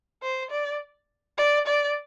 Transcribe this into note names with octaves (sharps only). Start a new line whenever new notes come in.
C5
D5
D5
D5